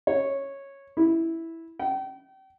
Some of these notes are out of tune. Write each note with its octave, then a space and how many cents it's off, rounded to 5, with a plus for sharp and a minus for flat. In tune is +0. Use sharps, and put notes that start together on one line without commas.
C#5 -10
E4 -5
G5 -35